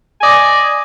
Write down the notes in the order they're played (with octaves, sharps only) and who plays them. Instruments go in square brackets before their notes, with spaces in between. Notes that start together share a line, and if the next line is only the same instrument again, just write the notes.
[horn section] D5 D#5 G#5